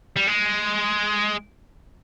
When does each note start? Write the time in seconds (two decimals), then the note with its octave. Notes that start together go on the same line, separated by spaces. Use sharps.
0.16 G3
0.27 G#3